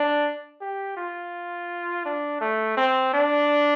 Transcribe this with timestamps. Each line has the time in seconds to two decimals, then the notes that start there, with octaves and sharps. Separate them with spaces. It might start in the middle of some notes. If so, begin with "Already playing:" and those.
Already playing: D4
0.61 G4
0.97 F4
2.05 D4
2.41 A3
2.77 C4
3.14 D4